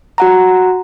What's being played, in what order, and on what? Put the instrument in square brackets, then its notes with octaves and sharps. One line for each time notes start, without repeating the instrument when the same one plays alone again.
[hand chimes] F#4 F#5 A#5